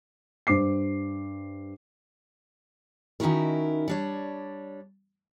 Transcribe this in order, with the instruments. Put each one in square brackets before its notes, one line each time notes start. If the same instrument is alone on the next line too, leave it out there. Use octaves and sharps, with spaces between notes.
[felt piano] G2 C5 D6 C7
[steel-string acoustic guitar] D#3 C#4 D#4 E4 F#4 A#4
G3 D4 C#5